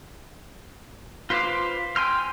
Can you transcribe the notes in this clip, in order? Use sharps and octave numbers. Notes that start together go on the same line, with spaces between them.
F4 B4 C5 F5 D6
G5 G#5 C6 F6